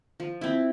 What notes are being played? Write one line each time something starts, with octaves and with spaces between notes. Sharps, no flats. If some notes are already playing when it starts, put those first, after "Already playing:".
F3
C4 E4